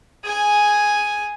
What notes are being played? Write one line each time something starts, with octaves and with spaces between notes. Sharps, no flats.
G#4 G#5